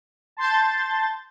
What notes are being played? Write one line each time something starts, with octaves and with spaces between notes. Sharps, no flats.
A5 C6 G6 A6